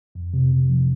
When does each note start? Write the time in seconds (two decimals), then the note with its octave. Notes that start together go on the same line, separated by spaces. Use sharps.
0.15 F2
0.34 C3
0.52 C3
0.69 F3